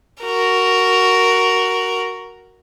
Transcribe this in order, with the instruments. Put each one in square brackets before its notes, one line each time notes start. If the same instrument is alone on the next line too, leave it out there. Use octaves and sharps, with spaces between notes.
[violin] F#4 A#4